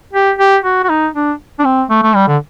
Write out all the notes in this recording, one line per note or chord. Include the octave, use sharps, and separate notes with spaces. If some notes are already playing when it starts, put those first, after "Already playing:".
G4
G4
F#4
F#4
D#4
D4
D4
C4
A3
A3
G3
D3